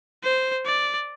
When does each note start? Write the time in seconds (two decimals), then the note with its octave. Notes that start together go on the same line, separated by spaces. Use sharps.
0.23 C5
0.66 D5